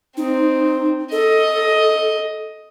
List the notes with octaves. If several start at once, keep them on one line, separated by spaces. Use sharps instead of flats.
C4 D#4
A4 D#5